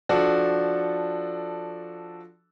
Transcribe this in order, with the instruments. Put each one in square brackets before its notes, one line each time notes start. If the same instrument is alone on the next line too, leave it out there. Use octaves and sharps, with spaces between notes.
[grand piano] F3 D4 F#4 A4